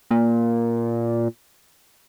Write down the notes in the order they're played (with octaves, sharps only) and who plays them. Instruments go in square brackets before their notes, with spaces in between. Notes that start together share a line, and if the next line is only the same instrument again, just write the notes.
[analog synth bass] A#2